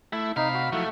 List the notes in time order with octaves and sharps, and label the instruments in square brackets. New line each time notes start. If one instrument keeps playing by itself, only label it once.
[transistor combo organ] A3 [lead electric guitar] E4
[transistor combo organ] C3 B5 [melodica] D#4 [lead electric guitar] F5
[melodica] F#4
[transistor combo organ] F3 F#3 E4 [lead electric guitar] A3